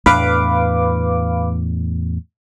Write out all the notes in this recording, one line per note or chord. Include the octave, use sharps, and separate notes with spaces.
E2 A2 D4 B4 F5 D6